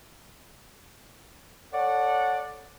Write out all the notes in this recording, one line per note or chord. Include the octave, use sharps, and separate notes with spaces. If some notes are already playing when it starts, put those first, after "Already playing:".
A4 C#5 D5 F#5